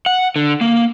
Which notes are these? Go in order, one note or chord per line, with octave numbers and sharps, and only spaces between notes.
F#5
D3
A#3